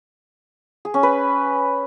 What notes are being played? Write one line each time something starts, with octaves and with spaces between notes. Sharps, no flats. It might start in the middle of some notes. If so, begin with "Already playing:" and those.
G#4
C#4
B4